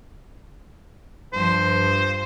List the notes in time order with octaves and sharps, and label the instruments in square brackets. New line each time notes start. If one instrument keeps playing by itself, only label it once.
[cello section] G2 F3 [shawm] C5